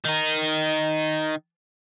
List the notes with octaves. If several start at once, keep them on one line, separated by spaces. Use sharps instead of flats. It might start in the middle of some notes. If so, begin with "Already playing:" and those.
D#3 D#4